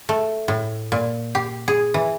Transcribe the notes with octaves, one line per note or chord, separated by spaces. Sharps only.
A3
A2
A#2
G4
G#4
E3